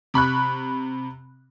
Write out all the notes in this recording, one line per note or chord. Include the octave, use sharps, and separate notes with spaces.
C3 B5 C#6 F#6